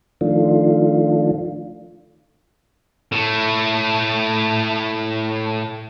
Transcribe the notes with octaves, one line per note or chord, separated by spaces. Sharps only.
D#3 F3 A3 D4 F4
A2 A3